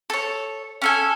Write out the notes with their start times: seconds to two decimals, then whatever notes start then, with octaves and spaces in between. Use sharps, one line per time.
0.10 A4 C#5
0.82 C#4 A4 G#5